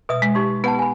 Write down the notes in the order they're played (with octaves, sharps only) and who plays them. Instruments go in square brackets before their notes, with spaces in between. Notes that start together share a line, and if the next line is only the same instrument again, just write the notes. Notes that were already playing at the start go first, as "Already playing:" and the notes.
[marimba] B2 [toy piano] B4 E5 D#6
[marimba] G#3
[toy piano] D#4 G4 C6
[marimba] B3 [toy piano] B4 F#5 A5
[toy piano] G#5 B5